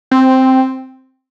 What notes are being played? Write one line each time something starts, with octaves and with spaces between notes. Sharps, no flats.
C4